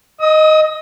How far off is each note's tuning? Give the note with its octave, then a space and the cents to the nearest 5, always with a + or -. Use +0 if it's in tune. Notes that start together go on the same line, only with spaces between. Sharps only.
D#5 +0 D#6 +40